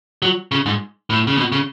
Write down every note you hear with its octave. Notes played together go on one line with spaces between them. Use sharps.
F#3
C#3
G#2
A2
C#3
B2
C#3